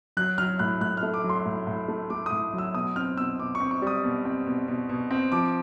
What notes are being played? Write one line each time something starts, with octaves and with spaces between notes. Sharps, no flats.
F#3 F#6
F#3 F6
A2 F#6
A2 F#6
F6
A3
D6
F#3
C6
A2
A2
A3
A3 D6
A2 D#6
F#3 E6
B2 D#6
C4 F6
B2 E6
B2 D6
C#6
C4
C#6
G3 D#6
B2
C4
B2
B2
B2
C4
F3 D6